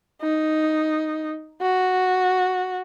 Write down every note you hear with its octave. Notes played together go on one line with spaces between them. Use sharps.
D#4
F#4